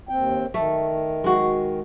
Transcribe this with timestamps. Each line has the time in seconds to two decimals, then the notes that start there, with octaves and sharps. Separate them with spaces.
0.09 D#2 C4 G5
0.54 D#3 A3
1.24 G#3 F#4